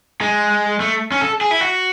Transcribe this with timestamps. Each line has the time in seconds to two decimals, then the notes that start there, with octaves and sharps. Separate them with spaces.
0.21 G#3
0.80 A3
1.12 C#4
1.21 A4
1.41 G#4
1.51 E4
1.60 F#4